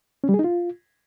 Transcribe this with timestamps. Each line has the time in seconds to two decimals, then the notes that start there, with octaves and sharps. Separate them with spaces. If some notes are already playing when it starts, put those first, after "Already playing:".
0.24 C#4
0.29 G3
0.34 G#4
0.39 D#4
0.44 F4